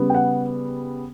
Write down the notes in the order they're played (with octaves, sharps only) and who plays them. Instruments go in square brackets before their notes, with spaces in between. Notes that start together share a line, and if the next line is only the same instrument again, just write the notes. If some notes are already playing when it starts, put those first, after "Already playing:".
Already playing: [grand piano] C#3 G3 B3
G5
F#5